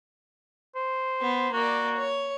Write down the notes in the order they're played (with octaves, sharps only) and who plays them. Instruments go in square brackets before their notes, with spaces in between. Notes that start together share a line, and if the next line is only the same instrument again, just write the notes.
[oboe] C5
[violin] B3
[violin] A#3 D5 [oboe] F#4
[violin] C#5